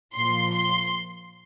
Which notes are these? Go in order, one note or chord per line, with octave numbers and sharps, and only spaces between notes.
A#2 F3 C6
C6